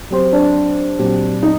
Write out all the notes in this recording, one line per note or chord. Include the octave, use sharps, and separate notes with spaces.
F#3 C4 G4 C5
D4
A#2 F#3 C4 G4
D#4